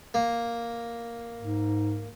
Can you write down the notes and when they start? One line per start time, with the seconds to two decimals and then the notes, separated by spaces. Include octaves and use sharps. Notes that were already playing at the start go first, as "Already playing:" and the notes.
0.14 A#3
1.38 G#2